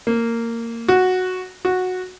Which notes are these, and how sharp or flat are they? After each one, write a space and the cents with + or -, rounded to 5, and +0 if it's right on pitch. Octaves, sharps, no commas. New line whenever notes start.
A#3 -15
F#4 -5
F#4 -10